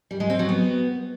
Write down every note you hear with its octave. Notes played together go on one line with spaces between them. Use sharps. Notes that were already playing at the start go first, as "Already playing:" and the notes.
G3
G#3
C4
F#3
B3